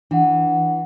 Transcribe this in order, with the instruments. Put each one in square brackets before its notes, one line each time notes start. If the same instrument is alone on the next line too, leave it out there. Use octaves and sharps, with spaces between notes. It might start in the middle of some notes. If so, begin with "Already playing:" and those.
[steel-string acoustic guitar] E3 [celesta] D4 F#5